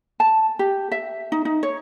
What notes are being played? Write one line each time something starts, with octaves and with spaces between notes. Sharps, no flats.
A5
G4
E5
D#4
D#4
C#5